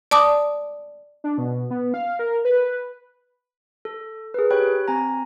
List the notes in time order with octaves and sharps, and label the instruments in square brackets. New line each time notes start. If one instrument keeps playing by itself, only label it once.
[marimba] D5 A5 D6 D#6
[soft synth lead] D4
B2
B3
F5
A#4
B4
[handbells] A4
G#4 A#4 B4
G4 C#5 G5 B5 F#6
C4 G#5 A#5